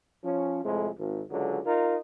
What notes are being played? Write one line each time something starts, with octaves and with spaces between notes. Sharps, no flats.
F3 C#4
F2 A2 C3 G#3
G#1
C#2 D3 F#3 G#3
D#4 F4 A#4